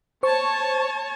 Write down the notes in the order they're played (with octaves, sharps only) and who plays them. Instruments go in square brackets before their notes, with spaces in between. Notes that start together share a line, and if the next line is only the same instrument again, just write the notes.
[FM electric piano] C5 C#6 [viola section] C#5 A5